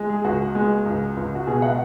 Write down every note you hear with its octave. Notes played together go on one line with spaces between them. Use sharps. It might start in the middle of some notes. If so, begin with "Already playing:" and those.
Already playing: G#3
G#4
C#2 F#4
G#3
C#2
C#2
F#4
B2 G#4
F#5